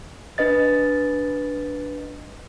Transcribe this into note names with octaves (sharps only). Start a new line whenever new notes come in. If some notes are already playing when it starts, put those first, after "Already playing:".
D4 B4 D#5 A6